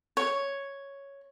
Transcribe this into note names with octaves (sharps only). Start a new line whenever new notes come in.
C#5